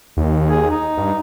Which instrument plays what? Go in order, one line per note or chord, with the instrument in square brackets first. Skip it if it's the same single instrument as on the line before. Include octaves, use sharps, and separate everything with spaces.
[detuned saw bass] D#2
[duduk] G#4
D#4
[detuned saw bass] G2